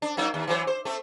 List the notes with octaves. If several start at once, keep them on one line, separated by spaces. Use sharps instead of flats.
D4
F#3 A#3 D#4
D#2
E3 F#3 C5
C5
A3 C4